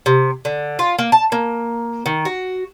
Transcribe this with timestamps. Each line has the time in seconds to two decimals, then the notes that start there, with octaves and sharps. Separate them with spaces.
0.06 C3
0.45 D3
0.79 F4
0.99 A#3
1.12 A5
1.32 A#3
2.06 D#3
2.25 F#4